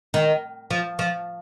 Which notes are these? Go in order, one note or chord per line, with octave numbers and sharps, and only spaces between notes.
D#3
F3
F3